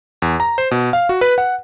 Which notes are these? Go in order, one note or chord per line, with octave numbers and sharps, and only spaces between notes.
E2
A#5
C5
B2
F5
F#4
B4
F#5